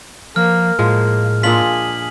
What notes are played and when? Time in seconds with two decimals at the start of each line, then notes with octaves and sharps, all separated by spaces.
0.36 F3 A#3 F6
0.79 A2 F3 G#3 A#3
1.43 A#2 D4 F4 G#4 B6 F#7